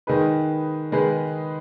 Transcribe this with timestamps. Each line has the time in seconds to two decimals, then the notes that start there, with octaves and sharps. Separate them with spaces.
0.07 D#3 G#3 D#4 G#4 B4
0.92 D#3 G#3 D#4 G#4 B4